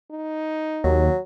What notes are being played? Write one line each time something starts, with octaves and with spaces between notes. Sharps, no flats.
D#4
D#2 F#3